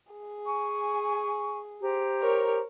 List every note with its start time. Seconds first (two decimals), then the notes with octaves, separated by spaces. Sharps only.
0.12 G#4
0.46 G#5 C#6
1.82 G4 C5 A#5
2.22 A#4 C#5